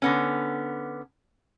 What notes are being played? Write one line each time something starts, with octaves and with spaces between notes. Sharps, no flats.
D3 B3 C#4